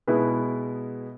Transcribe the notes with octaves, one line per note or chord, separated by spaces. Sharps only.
B2 G#3 B3 E4 B4